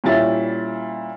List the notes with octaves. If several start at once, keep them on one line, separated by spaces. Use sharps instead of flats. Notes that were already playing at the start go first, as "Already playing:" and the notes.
A#2 G3 C#4 E4 A6